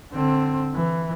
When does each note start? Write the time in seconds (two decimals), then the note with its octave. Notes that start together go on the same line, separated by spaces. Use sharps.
0.13 D3 C4
0.74 E3